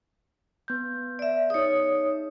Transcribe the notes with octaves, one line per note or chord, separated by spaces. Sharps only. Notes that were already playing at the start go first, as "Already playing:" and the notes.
B3 G6
D5 E5
D#4 G#4 C#5 D#6